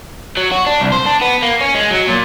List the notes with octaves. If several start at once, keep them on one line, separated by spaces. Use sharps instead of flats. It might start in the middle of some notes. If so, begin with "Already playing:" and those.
F#3
F#4
D4
C2
C5
D4
B3
A#3
C#4
G#3
F#3
A#2